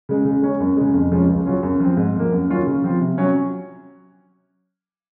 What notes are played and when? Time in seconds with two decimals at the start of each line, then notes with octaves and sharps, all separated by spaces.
0.09 C#3 G#3
0.25 C#3
0.42 G#3 C#4
0.60 F#2
0.77 C#3 G#3
0.94 F2
1.12 C#3 F3 G#3 C#4
1.29 C#2
1.46 C#3 F#3 C#4 F4
1.63 F#2
1.80 F3 C4
1.97 G#2
2.15 F3 A#3
2.32 F#2
2.50 D#3 F#3 C#4 F4
2.66 C#3
2.84 F3 C4 F4
3.01 C3
3.18 F#3 C#4